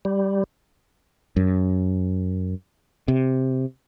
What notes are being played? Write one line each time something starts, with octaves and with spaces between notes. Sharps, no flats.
G3
F#2
C3